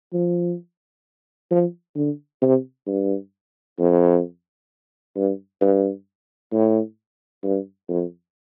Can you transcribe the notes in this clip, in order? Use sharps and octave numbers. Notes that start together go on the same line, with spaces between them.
F3
F3
D3
C3
G2
F2
G2
G2
A2
G2
F2